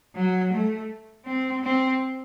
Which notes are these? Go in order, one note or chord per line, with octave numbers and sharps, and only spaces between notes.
F#3
A3
C4
C4